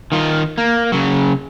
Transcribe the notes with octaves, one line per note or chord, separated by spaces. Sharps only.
D#3 F4
A#3
C#3 F#3